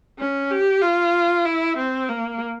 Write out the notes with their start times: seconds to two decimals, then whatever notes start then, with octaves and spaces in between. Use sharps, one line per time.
0.19 C#4
0.51 G4
0.82 F4
1.46 E4
1.77 C4
2.09 A#3